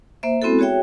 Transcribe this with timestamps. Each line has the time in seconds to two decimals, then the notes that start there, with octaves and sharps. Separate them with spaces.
0.23 A#3 C5 E5
0.42 G#3 B3 C4 E4 F#4 A4
0.59 F#4 G#4 C#5 E5 G5